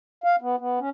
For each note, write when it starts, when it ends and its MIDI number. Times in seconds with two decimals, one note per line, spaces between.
0.24 0.36 77
0.41 0.56 59
0.58 0.79 59
0.79 0.90 61